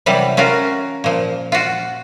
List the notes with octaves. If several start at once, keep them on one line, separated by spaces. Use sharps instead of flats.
C3 E3 F#3 G3
C#4 F4 F#4 A#4
A#2 F3
F4 F#4